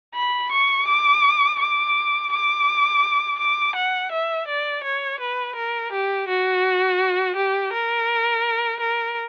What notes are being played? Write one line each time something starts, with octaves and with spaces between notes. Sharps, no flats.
B5
C#6
D6
D6
D6
D6
F#5
E5
D5
C#5
B4
A#4
G4
F#4
G4
A#4
A#4